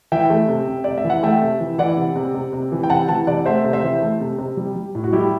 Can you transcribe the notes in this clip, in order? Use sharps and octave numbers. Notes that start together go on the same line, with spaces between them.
E3 E5 G5
A3
C3
C3
C3 D5
E5
E3
F#5
A3 E5 G5
C3
E3
E3 D5 F#5
C3
C3
C3
C3
E3
G5
C3 F#5 A5
E3 F#5 A5
C3 D5 F#5
A3 C5 E5
C3
C5 E5
E3
A3
C3
C3
G3
G3
A2
F#4
G3 E4 G4